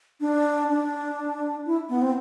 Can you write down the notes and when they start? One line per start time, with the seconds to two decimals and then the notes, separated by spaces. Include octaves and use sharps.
0.20 D4
0.69 D4
1.66 E4
1.89 B3
2.02 C4